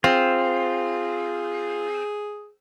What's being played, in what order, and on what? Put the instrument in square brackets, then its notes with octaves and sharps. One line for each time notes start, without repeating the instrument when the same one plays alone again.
[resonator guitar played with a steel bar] C4 [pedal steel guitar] F4 [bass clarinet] G#4